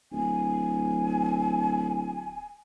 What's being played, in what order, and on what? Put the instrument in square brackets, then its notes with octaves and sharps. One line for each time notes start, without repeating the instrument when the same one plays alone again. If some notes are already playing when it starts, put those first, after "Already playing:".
[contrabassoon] D1 [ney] G#5